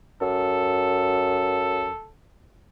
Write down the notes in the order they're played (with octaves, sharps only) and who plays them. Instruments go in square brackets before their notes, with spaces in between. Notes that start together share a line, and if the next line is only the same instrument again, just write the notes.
[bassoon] F#2 [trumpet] A4